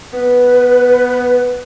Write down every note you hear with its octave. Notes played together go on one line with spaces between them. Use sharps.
B3 B4